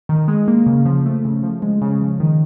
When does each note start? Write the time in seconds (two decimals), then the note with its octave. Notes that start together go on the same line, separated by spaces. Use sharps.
0.09 D#3
0.28 G#3
0.48 A#3
0.66 C#3
0.85 F3
1.06 A3
1.25 C#3
1.43 F3
1.62 G#3
1.81 C#3
2.01 F3
2.20 D#3